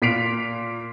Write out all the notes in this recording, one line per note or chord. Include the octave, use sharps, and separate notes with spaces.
A#2 F5 B6 C7 D7 F7